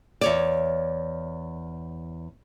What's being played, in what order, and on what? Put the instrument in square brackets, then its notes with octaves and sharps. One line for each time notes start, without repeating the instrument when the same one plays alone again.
[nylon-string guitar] E2 C#5 D5